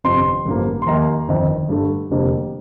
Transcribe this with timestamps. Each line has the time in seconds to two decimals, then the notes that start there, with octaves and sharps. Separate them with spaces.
0.04 G1 F2 C3 F3 C4 C6
0.46 A1 G2 D3 F3 A#3
0.82 C6
0.86 D#2 D#3 A#3 A#5
1.28 G1 F2 D#3
1.69 G2 D3 A3
2.10 F1 F2 D3 G3 A#3